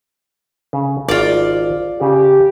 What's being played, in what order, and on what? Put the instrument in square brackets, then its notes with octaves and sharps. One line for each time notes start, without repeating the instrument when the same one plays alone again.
[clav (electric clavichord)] C#3
[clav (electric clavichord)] G#1 [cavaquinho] F4 D5
[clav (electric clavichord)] C#3 [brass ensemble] G4